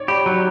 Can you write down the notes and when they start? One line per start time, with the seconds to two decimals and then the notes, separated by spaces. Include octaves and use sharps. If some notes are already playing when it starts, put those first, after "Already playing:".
Already playing: C#5 D5
0.08 G4 B5
0.26 F#3 A#5